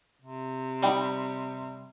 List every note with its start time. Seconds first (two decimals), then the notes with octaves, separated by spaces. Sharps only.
0.22 C3
0.83 G3 D#4 G5 B5